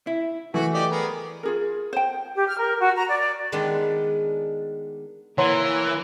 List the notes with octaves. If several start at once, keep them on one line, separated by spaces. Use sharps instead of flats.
E4
E3 A3 F#4
G4 D5 D#5
B3 G#4 A#4
F4 G#4 A#4
C5 G5
G4
F6
A#4
F#4
A#5
D5
D5
D#3 G#3 B3 D4
E3 A#3 A#4 C#5 F#5 A#5 C6